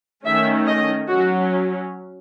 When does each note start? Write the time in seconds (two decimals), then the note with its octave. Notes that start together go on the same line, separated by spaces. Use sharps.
0.25 D#3 A3 C#4 E5
0.67 D#5
1.09 F#3 C#4 F#4